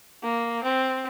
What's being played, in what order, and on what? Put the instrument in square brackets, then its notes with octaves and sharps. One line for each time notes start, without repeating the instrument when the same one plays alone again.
[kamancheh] A#3
C4